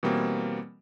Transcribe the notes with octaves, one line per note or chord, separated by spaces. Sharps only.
B2 E3 G3 A#3 C4